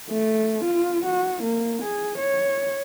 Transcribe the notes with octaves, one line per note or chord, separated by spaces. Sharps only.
A3
F4
F#4
A#3
G#4
C#5